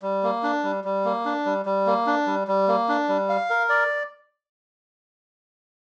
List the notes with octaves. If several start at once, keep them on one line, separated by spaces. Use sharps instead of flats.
G3
A#3
D4
G3
G3
A#3
D4
G3
G3
A#3
D4
G3
G3
A#3
D4
G3
F5
A#4
D5